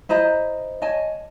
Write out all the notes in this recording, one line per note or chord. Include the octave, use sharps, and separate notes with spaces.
E4 C5 D#5 A#5
C#5 D#5 G#5 A5